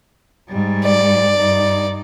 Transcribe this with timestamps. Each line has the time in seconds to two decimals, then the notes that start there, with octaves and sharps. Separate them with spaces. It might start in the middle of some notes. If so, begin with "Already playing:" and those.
0.49 G#2 G3
0.84 D5
1.39 G2 D#4